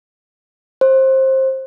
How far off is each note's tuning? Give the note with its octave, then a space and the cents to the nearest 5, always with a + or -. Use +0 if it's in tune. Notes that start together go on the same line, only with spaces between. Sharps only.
C5 +20